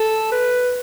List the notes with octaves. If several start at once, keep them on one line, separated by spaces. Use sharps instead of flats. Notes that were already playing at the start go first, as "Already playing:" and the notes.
Already playing: A4
B4